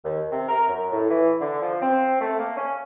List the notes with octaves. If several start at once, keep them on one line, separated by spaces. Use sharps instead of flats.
D#2
C3
A#4
F#2
A2
E3
D3
F3
C4
A3
A#3
C#4